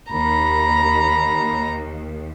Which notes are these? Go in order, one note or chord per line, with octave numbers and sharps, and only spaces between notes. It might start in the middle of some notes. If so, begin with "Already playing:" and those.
D#2 A#5 B5